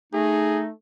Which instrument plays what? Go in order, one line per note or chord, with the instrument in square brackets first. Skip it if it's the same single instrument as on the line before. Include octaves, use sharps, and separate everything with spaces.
[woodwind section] A3 D#4 [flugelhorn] G#4